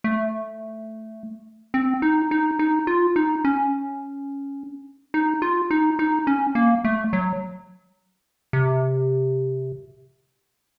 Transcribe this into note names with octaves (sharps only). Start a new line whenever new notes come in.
A3
C4
D#4
D#4
D#4
F4
D#4
C#4
D#4
F4
D#4
D#4
C#4
A#3
A3
F#3
C3